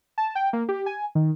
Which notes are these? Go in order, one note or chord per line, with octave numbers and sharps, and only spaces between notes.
A5
G5
A#3
G4
G#5
D#3